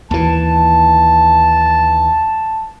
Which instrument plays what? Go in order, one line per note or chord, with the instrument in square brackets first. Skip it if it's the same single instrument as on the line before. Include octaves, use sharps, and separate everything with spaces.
[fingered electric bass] D#2 E3 [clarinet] A5